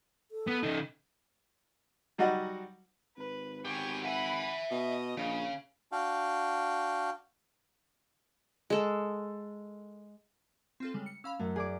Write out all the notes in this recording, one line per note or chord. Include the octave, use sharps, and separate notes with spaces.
A4
B3
C#3 D#4
F#3 G3 D#4 F#4 D#5 F#5
G#1 B4
B3 G4 G#5 C#6
E5 F#5 G#5 B5
B2 D#5
A#1 C#3
D4 F#4 F5 G5
G#3 A4
C4 F4 A4 C7
C#3 G3 G#3
C#7
C#4 F5 B5 E6
F#2 A3
G#4 D5 D6